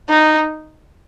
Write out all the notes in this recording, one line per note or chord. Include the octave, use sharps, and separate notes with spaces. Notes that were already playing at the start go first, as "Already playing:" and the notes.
D#4